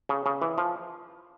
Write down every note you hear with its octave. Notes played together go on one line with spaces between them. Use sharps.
C#3
C#3
E3
F3